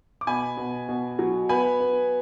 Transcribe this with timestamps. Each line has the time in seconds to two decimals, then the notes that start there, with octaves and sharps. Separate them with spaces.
0.21 D6
0.27 B2 G#5 B5
0.57 B2
0.89 B2
1.19 F#3
1.49 B3 G#5 B5
1.80 B3